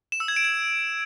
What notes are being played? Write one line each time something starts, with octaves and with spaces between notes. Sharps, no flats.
E7
E6
G#6
D7
G#6